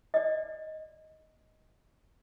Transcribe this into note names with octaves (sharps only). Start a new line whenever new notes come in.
D5 D#5